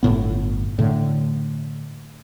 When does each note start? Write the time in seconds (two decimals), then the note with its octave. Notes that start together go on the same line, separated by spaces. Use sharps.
0.03 G1 F2 A2 B3
0.79 A2 D3